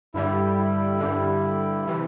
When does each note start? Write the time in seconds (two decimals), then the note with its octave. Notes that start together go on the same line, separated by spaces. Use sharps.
0.14 G2 D3 G3 E4
0.58 E4
1.00 G2 D3 G3
1.88 C3 E3